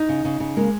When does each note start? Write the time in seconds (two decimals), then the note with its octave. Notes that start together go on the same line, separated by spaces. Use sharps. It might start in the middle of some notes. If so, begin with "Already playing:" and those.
Already playing: D#4
0.09 C#3
0.25 C#3
0.40 C#3
0.57 G#3 A#3